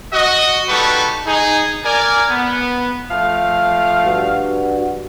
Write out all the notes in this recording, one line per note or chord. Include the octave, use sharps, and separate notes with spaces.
F#4 D#5
G3 D#4 F#4 A4 B4 C#6
D#4 G#4
A#4 D5 G#5
B3
F3 A3 F5
G2 F#4